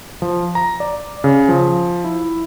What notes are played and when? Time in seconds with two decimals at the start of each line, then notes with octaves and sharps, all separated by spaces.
0.22 F3
0.55 A#5
0.80 D5
1.24 C#3
1.49 F3
2.05 E4